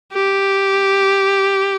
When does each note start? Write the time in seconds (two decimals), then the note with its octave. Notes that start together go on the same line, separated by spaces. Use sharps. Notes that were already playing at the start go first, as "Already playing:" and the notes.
0.13 G4